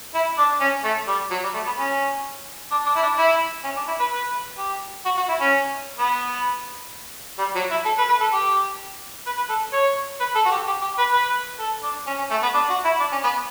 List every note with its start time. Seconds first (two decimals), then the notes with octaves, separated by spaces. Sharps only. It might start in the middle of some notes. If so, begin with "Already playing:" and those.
0.14 E4
0.38 D4
0.60 C#4
0.84 A3
1.07 G3
1.31 F#3
1.43 G3
1.54 A3
1.66 B3
1.78 C#4
2.71 D4
2.86 D4
2.96 E4
3.03 D4
3.18 E4
3.64 C#4
3.77 D4
3.88 E4
3.99 B4
4.12 B4
4.58 G4
5.05 F#4
5.17 F#4
5.28 E4
5.40 C#4
5.99 B3
7.38 G3
7.55 F#3
7.71 E4
7.85 A4
7.98 B4
8.09 B4
8.21 A4
8.33 G4
9.26 B4
9.37 B4
9.49 A4
9.73 C#5
10.20 B4
10.35 A4
10.45 F#4
10.51 G4
10.67 G4
10.82 G4
10.98 B4
11.13 B4
11.59 A4
11.83 D4
12.07 C#4
12.18 C#4
12.31 A3
12.42 B3
12.54 D4
12.69 F#4
12.85 E4
13.00 D4
13.12 C#4
13.23 B3